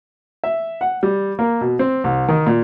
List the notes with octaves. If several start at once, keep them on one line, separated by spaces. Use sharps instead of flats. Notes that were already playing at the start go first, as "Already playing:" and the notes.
E5
F#5
G3
A#3
B2
C4
C2
D#3
A#2